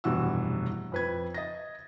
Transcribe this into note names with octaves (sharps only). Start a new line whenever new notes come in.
F1 G2 B2 E3 F#5 E6
F2 B4 G#6
D#5 A6 A#6